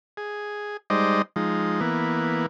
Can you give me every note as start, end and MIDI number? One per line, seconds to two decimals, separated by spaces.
0.17 0.77 68
0.90 1.22 55
0.90 1.22 56
0.90 1.22 63
0.90 1.22 72
0.90 1.22 74
0.90 1.22 75
1.36 1.80 53
1.36 1.80 56
1.36 1.80 63
1.81 2.46 52
1.81 2.46 58
1.81 2.46 59